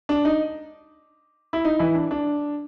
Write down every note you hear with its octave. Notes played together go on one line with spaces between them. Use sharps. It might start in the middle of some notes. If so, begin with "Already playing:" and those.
D4
D#4
E4
D#4
E3 E4
D4
D4